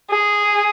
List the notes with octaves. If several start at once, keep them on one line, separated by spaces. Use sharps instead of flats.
G#4